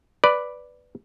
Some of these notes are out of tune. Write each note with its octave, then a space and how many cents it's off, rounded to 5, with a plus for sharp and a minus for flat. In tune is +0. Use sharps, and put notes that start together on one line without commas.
B4 +0 D5 +0